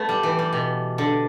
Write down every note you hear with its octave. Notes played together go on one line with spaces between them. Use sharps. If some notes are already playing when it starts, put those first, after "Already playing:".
Already playing: A3 B3
G3
E3
G3
B2
D3